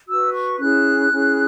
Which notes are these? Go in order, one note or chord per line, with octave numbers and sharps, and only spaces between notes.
F#4 B4 E6
C#6
C#4 E4 G#4 F#6
C#4 E4 G#4